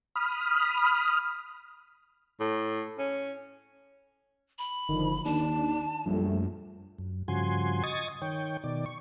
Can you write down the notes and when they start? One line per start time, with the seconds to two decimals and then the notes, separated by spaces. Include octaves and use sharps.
0.15 B5 D#6 F6
2.40 A2
2.99 C#4
4.59 B5
4.89 F#1 D3 D#3 F3
5.25 D#2 D#3 D4 A5
6.05 A#1 F#2 F3 G3 A3
6.99 F#2
7.28 G2 C#3 F3 F#4 G#5 C6
7.83 D#5 C#6 D#6 G#6 A6
8.22 D#3 C#5 G5
8.64 B2 D#3 D5
8.86 C#6